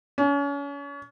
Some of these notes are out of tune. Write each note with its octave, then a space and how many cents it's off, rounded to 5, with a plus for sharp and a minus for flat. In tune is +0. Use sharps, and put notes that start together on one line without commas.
C#4 +35